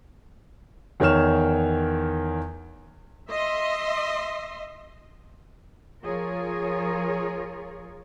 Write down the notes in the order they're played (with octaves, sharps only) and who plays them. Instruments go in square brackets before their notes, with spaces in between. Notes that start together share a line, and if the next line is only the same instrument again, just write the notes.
[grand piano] E2 D#3 C#5 F6 E7
[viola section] D#5 E5 C6
[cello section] F3 F4 G#4 A#4 C#5